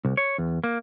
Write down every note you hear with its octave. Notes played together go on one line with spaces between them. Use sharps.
C2
C#5
E2
A#3